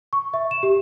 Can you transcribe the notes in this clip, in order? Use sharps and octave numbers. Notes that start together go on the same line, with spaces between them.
C#6
E5
E7
G4